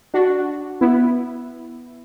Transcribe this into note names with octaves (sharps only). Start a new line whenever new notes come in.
D4 F#4
B3 E4